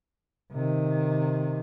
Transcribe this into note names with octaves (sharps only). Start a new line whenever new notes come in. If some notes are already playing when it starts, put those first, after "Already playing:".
C3 D#3